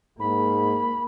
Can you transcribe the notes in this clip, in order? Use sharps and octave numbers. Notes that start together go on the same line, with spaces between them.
G#2 A#3 B5